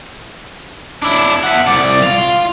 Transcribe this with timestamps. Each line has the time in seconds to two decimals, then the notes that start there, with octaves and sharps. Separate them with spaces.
1.02 D4 E4
1.43 E5 F#5
1.67 C2 D5
2.03 F4 F5